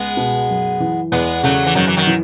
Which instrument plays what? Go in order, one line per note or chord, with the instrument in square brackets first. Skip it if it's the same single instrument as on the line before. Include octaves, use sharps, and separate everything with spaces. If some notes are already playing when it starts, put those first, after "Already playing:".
Already playing: [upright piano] C#2 [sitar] G#3 B3
[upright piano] B2
F#2
E3
[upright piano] E2 [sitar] G#3 B3
[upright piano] C#3 [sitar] F#3 A3
[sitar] E3
[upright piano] F#2 [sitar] D#3 F#3
[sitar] E3
D#3 F#3
[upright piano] E3